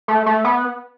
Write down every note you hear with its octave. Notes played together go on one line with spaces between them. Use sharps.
A3
A3
B3